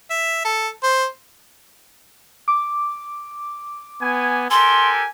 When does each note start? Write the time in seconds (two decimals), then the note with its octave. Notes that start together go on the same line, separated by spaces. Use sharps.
0.10 E5
0.45 A4
0.83 C5
2.48 D6
4.02 B3 G#5
4.50 G4 A4 A#4 G#5 C6